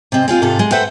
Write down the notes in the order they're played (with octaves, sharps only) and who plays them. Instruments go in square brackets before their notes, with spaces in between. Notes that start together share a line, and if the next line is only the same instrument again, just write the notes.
[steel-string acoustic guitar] C3 G#3 C4 D#5
G#3 C4 F4 G#4
G#2 C3 D#4 F4 A4
G#3
A4 B4 C5 E5 F#5 G5